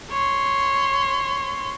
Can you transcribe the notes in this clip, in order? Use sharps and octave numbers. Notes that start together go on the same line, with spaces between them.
C#5 C6